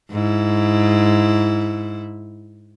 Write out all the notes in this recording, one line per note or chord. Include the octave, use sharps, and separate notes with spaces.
G#2 E4